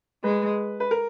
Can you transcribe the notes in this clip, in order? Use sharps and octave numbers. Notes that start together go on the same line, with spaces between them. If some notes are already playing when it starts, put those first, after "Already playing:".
G#3 B4
B4
A#4